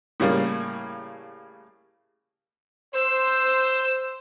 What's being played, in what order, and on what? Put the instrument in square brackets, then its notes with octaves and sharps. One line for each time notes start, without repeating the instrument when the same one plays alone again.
[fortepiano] A2 C#3 G3 A#3
[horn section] C5 [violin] E6